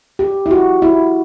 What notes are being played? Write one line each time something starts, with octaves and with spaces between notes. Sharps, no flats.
G4
E4
F#4
E4